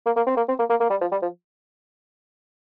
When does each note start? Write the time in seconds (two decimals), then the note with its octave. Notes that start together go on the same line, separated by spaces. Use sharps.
0.06 A#3
0.16 A#3
0.27 C4
0.37 A#3
0.49 C4
0.59 A#3
0.70 A#3
0.80 A#3
0.90 G3
1.01 F3
1.12 G3
1.22 F3